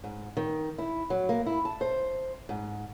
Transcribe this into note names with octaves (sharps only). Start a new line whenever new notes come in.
G#2
D#3
E4
F#3
A#3
E4
A5
C5
G#2